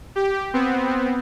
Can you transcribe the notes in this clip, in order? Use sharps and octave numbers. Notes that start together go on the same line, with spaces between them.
G4
B3 C4